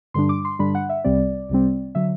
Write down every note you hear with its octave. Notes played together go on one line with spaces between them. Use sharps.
G2 D3 G3 D4 C6
D6
C6
G2 D3 G3 D4 B5
F#5
E5
C2 C3 G3 C4 D5
C2 C3 G3 C4
D3 F#3 E5